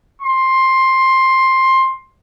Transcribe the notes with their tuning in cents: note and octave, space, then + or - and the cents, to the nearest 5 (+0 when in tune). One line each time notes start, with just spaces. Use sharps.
C6 +10